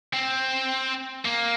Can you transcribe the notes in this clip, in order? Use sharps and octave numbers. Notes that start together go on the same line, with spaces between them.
C4
A#3